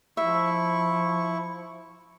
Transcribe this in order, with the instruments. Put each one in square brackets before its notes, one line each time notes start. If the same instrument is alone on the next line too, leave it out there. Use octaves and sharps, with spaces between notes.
[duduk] F3 [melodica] E4 C#6 [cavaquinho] E5